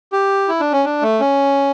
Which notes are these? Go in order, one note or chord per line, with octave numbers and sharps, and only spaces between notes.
G4
E4
D4
C#4
D4
A3
C#4